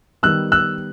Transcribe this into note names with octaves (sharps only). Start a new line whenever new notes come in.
D#3 G3 B3 E6 F#6
E6 F#6